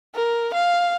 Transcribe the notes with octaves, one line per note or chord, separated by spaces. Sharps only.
A#4
F5